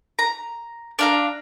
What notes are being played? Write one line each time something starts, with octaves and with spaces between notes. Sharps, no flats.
A#5
D4 F5 A#5